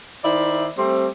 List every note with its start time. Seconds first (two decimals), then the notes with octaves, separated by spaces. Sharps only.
0.24 D#3 E4 C5 D5 E5
0.78 G3 A3 C4